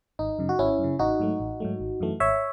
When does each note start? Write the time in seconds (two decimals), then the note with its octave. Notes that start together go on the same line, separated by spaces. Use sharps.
0.19 G#1 D#4
0.39 F#2 C#3
0.49 F#4
0.59 G#1 C#4 E4
0.79 F#2
0.84 C#3
0.99 A1 D#4 F#4
1.20 G#2 F#3 A3
1.40 A1
1.60 G#2 F#3 A3
1.80 G#1
2.00 F#2 E3 A3
2.20 G#1 C#5 E5